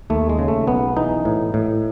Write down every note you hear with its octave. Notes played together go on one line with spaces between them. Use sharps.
D#2 A3
G#3
C#3
A3
B1 B3
E3 D#4
A2
A2